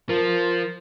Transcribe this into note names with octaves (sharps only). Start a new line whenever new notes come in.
F3 A#4